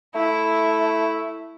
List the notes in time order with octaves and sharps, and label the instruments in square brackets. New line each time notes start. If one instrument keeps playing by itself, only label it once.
[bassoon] A3 [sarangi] E4